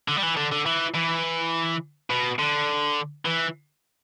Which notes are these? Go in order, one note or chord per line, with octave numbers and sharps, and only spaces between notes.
D3
G3
E3
D3
D3
E3
E3
B2
D3
E3